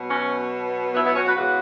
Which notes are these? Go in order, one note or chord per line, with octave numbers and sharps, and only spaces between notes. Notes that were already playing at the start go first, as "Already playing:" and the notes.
Already playing: B2 F#3 B3
C#4 F#4
B3 E4
B3 E4
C#4 F#4
F#4 B4
C#3 E3 G#3 B3 F#4 B4